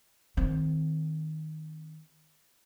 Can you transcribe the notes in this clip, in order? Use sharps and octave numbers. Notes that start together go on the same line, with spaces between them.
D#3 C4